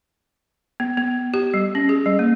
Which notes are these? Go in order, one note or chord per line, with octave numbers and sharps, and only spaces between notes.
B3
B3
G4
G3
C#4
G#4
G3
A#3